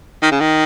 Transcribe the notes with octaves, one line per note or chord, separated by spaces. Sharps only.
D#3
C#3
D#3